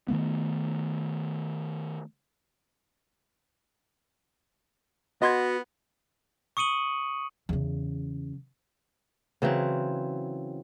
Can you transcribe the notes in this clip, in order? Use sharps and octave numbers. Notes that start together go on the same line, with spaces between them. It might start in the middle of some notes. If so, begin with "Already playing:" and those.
D#3 F3 A3 B3
B3 F#4 D#5 C6 G#6
C#6 D#6 C#7 D#7 F#7
E2 C#3
C#3 E3 F#3 C4